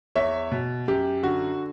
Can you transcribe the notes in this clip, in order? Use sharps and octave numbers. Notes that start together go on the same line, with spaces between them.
E2 C#5 E5
B2
F#2 G4
D3 F#4